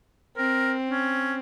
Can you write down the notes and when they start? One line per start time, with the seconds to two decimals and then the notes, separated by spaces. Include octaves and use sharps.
0.37 C4 A#4
0.90 C#4